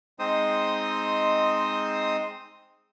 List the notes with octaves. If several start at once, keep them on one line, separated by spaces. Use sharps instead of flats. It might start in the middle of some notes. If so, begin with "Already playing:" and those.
G#3 C4 D#4 C5 D#6